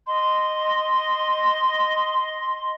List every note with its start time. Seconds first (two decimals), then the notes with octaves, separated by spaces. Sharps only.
0.07 D#5 C6